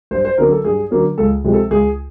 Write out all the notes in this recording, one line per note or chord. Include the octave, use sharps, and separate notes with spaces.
G2 C5
C5
D3 F#3 A#3 C#4 A#4
A4
G2 G#4
D3 F#3 A#3 C#4
C#2 A4
C3 F3 G#3
A4
C#2 G#4